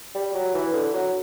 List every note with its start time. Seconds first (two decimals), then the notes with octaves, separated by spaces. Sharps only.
0.15 G3
0.34 F#3
0.54 E3
0.73 D3
0.93 F#3